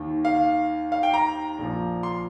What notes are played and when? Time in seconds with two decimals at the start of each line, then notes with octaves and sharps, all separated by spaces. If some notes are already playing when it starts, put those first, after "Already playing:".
Already playing: D#2 D#3
0.25 F5
0.92 F5
1.03 G5
1.14 A#5
1.59 A#1 A#2 F3
2.03 C6